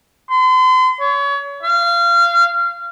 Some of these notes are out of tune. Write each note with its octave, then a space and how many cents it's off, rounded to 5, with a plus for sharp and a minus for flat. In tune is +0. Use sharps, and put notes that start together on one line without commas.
C6 -40
C#5 +30
F5 -25